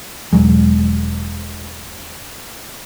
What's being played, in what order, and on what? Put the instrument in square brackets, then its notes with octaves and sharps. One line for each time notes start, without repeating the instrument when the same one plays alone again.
[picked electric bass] E1 F#3 G#3